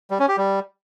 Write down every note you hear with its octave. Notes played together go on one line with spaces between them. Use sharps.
G3
C#4
G4
G3